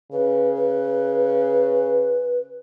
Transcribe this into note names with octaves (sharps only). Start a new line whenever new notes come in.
C#3 B4
B4